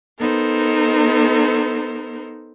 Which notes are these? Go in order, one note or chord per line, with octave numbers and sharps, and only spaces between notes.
B3 D#4 A4 A#4 C5